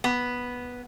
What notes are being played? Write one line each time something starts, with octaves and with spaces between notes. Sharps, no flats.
B3